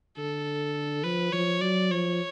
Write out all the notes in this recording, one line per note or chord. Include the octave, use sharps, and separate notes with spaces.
D3 A4
F3 B4
F3 C#5
F#3 D5
F3 C#5